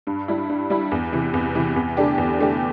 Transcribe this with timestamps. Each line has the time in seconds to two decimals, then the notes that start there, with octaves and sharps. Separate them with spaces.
0.07 G2
0.28 G3 E4
0.49 G2
0.70 G3 E4
0.91 E2
1.13 C3 E3
1.34 E2
1.55 C3 E3
1.76 E2
1.97 D3 A3 D4 G4
2.18 E2
2.39 D3 A3 D4 G4